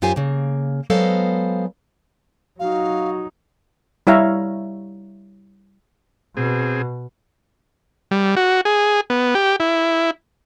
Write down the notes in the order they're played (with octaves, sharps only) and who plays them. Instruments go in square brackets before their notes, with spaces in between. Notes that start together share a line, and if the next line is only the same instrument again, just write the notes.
[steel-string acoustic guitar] F#2 F4 G4 C5 G#5
C#3 A#3
F#3 G#3 B3 A4 C5 F5
[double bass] F#3 D#4 [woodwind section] F#4 [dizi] F5
[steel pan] G3 E4 C#5 E5 F5 A#5
[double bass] B2 [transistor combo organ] C4 G#4
[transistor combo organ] G3
F#4
G#4
B3
G4
E4